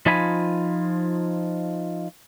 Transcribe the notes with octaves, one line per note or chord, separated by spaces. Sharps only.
F3 D#4 F4 G#5 B5